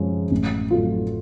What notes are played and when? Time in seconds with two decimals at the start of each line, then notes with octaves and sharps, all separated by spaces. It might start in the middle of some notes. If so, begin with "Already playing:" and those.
Already playing: F#2 F3 G#3 C#4
0.31 A1
0.71 A2 F#3 A3 F4